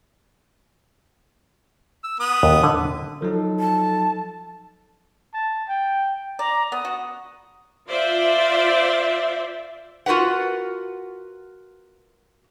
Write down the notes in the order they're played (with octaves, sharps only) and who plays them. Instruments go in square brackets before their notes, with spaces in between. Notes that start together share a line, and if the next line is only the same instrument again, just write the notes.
[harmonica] E6
B3 B4 D#6
[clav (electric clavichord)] D#2
D3
[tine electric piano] F3 F#3 D#4 [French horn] A4
[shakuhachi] A5
[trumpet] A5
G5
[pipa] D5 [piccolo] A#5
[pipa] B3 [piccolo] D#6
[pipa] F#4
[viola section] F4 C5 D5 E5
[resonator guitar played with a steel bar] F4 F#4 A#4 B4 F#5